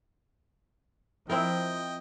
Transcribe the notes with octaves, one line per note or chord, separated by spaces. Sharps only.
F3 C4 E4 A#4 D#5 G5